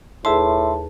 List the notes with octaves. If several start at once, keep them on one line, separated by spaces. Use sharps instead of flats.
D#2 A2 G#4 B4 E5 A5 C6